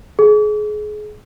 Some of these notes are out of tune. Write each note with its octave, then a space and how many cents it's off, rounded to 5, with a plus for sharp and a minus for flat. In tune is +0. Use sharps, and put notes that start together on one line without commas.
G#4 +30